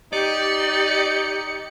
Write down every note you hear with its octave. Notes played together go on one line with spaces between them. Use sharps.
D#4 G4 D5 C#7